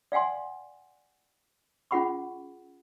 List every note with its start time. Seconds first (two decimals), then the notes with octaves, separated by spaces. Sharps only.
0.12 D5 F5 F#5 G#5 C6
1.91 C#4 F4 G#4 F#5 B5 C#6